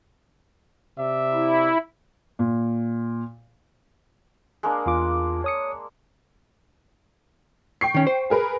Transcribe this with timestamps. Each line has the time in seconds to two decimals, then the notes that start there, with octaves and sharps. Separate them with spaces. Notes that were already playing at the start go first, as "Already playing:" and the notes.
0.98 C3 D5 E5
1.34 E4
2.39 A#2
4.63 G#3 A#3 D4
4.86 E2 F4 D6
5.44 C#5 D#6 C#7
7.81 G5 C#6 C7
7.94 D#3 C#4
8.07 C5
8.30 G#4 A#4 B4